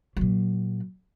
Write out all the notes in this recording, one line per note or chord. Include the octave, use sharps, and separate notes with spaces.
A#2 F#3